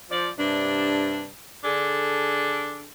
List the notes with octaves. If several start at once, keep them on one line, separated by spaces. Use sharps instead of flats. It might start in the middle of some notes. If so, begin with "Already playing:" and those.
F3 D5
G2 C3 D4
D3 D4 G#4 A4